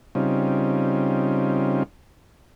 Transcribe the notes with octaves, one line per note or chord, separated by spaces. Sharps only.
C#3 G3 C4 C#4 D#4 F4